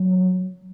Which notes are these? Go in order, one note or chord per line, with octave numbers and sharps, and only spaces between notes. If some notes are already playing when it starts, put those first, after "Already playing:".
Already playing: F#3